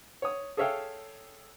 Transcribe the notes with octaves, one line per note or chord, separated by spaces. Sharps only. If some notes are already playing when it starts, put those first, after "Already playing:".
C#5 D#6
G#4 A4 C#5 E5 F5 G5